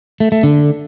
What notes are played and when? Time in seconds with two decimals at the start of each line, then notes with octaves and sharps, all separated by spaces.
0.20 A3
0.32 A3
0.43 D3